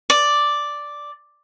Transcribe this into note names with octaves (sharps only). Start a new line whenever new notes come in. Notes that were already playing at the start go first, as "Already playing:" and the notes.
D5